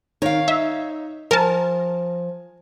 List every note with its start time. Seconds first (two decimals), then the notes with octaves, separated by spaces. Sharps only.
0.22 D#3 C#5 F5
0.48 D#4 E5
1.31 F3 A#4 G#5 A5